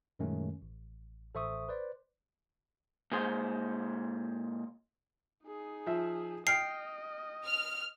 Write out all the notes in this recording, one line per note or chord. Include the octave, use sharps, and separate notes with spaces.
F#2 A#2 D#3 G#3 A3 C#4
A1
A1 A4 C5 E5 C#6 D#6
B4 C5 D5
A#2 G#3 C5
D#4 G#4
F3 E5
D#5 G5 F6 C7
F6